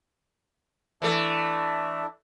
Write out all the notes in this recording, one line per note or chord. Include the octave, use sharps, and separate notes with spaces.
E3 A3 D4 E4